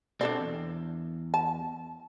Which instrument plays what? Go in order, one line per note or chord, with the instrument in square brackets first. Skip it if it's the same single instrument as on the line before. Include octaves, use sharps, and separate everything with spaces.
[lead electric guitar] B2 C4 [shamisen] D4 A4 D5
[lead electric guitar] E2
[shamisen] A5